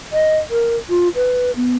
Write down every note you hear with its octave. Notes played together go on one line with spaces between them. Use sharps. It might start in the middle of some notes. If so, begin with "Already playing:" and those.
D#5
A#4
F4
B4
B3